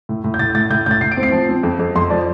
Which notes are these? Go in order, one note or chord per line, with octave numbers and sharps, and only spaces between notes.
A2
A2
G6
A2 A6
A2 A6
A2 G6
A2 G6 A6
A2 C7
D7
C4
C7
F3
C4
F2
F2
F2 C6
F3 D5